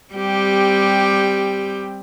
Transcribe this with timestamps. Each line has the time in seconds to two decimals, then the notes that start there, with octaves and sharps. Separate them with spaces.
0.14 G3 C4 G4